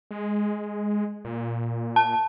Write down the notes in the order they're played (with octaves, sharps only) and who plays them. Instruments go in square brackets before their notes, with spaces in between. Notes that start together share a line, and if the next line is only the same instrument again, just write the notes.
[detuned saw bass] G#3
A#2
[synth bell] A5